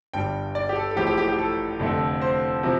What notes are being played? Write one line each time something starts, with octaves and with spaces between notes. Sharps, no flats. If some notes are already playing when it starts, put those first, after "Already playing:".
G1 G2 G3 G5
D5
G4
A4
A4
A1 A2 F3 A3 G4
G4
G4
G4
A4
F1 F2 D3 A3
C5
C3 F3